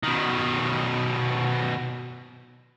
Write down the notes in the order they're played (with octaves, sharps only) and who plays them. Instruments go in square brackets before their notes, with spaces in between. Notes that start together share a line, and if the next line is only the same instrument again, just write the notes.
[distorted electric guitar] B2 D#3